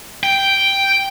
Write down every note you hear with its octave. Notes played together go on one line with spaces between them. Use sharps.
G5